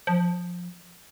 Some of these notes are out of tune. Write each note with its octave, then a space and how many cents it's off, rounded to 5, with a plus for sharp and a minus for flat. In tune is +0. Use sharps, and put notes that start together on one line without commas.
F3 +15